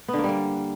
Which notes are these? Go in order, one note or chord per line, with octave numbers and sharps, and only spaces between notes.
B3
D3
A#3
G3
A#3